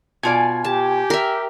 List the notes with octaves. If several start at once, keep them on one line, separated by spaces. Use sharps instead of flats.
B2 F4 D5 G#5
G4 A5
A#4 E5